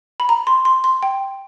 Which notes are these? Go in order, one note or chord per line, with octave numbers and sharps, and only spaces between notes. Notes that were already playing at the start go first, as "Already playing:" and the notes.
B5
A#5
C6
C6
C6
G5